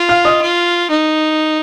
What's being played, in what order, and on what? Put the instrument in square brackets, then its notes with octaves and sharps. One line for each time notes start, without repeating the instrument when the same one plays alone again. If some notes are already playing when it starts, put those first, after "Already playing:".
Already playing: [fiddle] F4
[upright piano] F5 F6
D#5 D#6
[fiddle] F4
D#4